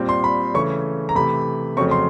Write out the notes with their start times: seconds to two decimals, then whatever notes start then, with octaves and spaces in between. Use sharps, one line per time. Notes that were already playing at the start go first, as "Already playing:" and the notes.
Already playing: A#2 G3 C4
0.09 C6
0.24 B5
0.54 C#3 E3 A3 C#4 C#6
1.09 A#5
1.15 C3 E3 A3 B5
1.77 F2 C#3 F#3 A3 C4 C#6
1.91 C6